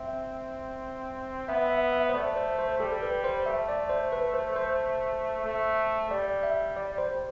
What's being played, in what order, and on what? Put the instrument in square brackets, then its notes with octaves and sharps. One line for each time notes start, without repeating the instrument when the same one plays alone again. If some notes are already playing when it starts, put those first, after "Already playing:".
Already playing: [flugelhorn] C4 [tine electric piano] E5
[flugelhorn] B3 [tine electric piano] E5
[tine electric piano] E5
E5
C5
[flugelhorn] A3 [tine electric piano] D5
[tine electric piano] C5
C5
[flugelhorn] G3 [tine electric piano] A4
[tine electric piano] B4
C5
[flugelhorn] A3 [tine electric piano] E5
[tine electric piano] D5
C5
B4
C5
C5
[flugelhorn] A3
[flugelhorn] G3 [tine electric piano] D5
[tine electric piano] E5
D5
C5